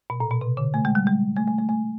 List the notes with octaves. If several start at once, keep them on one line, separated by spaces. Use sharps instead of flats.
B2
A#2
B2
C3
D3
A3
G#3
G3
G#3
A3
A3
A3
A3